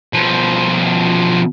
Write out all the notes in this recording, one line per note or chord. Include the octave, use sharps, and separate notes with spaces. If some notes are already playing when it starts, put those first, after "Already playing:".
B2 F3